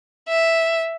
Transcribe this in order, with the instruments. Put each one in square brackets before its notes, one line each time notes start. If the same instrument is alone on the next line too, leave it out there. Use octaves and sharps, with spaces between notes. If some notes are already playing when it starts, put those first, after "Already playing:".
[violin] E5